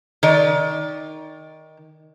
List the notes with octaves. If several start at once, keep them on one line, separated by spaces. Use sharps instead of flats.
D#3 D5